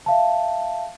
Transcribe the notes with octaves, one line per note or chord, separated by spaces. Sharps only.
E5 F5 A5